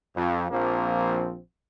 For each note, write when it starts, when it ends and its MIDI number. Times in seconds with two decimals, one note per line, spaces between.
0.16 0.45 41
0.51 1.38 34
0.51 1.38 53
0.51 1.38 58
0.51 1.38 60